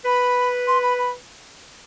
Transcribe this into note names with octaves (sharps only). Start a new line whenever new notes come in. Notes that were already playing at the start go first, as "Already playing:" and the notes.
B4 B5
C6
B5
B5